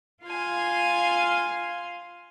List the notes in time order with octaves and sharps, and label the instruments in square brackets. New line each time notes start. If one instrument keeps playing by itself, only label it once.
[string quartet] F4 F5 G#5 C6